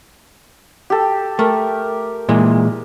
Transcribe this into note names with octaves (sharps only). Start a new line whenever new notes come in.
G4 A4
A3 A#4
A#2 E3 G#3